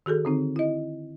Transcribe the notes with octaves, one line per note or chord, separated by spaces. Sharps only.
D#3 F#4 G#4 A4
D3 C4 D#4
E4 D#5